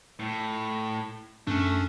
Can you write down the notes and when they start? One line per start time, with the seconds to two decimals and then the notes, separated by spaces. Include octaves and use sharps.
0.19 A2
1.47 F#2 A3 C#4 D4